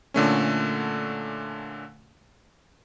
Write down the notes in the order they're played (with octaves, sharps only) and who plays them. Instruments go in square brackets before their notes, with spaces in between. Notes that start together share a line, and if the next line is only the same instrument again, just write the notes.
[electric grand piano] A#2 D3 A3 C#4